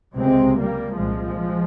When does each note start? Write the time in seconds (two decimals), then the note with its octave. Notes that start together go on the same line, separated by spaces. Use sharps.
0.17 C#2 C3 G#3 C4
0.58 G3 A#3
0.98 C2 A#2 F3 G#3